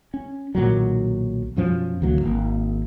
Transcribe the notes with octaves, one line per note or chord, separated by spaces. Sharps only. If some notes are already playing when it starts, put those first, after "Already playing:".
C#4
B1 A#2 D#3 F#3
F#2 B2 F3 C#4
D2 E3 F#3 A#3
G#1 A#3